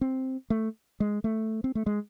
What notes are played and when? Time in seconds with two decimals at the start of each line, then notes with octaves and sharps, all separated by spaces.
0.01 C4
0.50 A3
1.00 G#3
1.24 A3
1.64 C4
1.75 A3
1.86 G#3